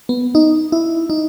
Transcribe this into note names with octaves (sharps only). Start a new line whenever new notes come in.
B3
D#4
E4
D#4